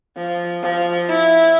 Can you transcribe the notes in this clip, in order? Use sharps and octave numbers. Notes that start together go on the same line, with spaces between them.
F3
F3
E4